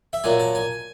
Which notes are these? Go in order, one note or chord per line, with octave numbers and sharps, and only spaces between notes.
E5
A#2 F#3 G#5
A5
G#5